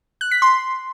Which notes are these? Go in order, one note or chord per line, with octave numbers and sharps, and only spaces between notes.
F#6
B6
C6